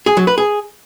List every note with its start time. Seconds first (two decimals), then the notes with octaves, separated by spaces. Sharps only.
0.06 G#4
0.17 F#3
0.27 B4
0.38 G#4